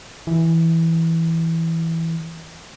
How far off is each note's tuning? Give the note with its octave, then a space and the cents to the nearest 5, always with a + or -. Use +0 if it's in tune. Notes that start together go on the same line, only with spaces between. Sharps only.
E3 -5